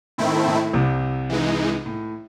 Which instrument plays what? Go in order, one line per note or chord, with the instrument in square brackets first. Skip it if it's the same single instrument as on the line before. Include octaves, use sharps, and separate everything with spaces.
[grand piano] A2 [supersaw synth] D#3 A3 C4 E4
[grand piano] A2
C2 C3
[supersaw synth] E3 G#3 D#4
[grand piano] A2